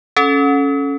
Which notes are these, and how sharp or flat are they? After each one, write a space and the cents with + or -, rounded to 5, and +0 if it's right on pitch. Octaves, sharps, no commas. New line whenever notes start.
C#4 +0 A4 -15